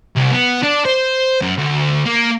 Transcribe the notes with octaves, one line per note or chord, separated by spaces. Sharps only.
C2
B3
D4
C5
F#2
D2
A#3